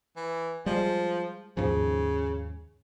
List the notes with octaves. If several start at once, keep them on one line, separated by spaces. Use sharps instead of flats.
E3
F3 G3 G#3
D#2 G#2 C#3 F3